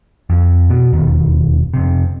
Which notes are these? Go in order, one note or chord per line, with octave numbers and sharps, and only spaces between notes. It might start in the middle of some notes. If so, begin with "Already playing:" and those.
F2
B2
E1 D#2
F2 C3